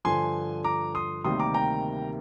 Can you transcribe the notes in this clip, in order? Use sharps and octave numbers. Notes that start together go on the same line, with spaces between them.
G2 D3 F3 G#5 C6
A#5 D6
C6 D#6
D2 C3 D#3 G3 A#3 C6 D#6
A#5 D6
G5 A#5